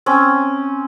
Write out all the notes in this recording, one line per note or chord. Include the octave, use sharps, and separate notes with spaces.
C4 C#4